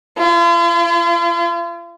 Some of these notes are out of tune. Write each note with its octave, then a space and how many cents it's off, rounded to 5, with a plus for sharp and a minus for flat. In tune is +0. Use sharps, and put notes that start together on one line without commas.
F4 -45